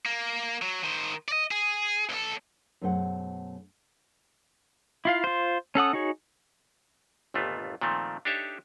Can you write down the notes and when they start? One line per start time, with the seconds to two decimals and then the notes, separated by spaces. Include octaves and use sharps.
0.06 A#3
0.62 F#3
0.84 D#3 C5
1.28 D5 D#5
1.51 G#4
2.09 B1 A4
2.82 F#2 B2 A3 G#4 C5 F#5
5.05 E4 F4 F5
5.24 F4 C5
5.75 C#4 A4 F#5 D#6
5.93 D#4 F#4 G#4 C#5
7.34 G1 D#2 A#2 A3 B3 F4
7.81 A#2 D#3 F3 A3 C4
8.25 D4 D#4 G4 A4 C#5 E5